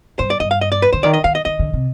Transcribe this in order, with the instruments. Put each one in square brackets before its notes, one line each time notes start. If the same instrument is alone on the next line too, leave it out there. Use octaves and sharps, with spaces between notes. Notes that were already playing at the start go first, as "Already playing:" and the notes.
[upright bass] G2 [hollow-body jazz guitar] C5
[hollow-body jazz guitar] D5
[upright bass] G2 [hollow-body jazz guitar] D#5
[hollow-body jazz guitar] F5
D#5
D5
B4
[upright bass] D3 [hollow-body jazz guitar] C5
[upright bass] D#3 [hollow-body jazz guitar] D5
[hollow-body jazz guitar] D#5
[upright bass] D#3 [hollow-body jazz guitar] F5
[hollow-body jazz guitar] D#5
[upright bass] D#3 [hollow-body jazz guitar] D#5
[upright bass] D3
C3